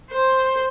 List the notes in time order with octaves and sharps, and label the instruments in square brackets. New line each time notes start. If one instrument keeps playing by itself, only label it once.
[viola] C5